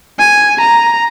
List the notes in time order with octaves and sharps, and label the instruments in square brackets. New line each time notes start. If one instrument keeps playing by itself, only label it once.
[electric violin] G#5
A#5